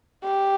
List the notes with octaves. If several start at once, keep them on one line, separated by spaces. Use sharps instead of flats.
G4